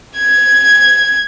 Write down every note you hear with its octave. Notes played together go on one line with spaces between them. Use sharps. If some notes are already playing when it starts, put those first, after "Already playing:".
G#6